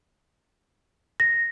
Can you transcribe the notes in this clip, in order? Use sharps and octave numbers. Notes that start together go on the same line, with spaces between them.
A#6